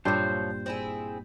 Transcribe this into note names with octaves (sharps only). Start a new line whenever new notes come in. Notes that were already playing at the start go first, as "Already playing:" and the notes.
G2 A#2 F3 F#3 C5
C4 E4 G#4